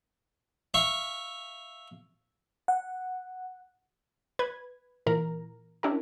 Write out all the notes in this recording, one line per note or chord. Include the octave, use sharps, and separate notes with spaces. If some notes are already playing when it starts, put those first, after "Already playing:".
E5 F5 C#6
F#5
B4 G#6
A#2 E3 A#4 A#5
C#4 D4 E4 G4 A#4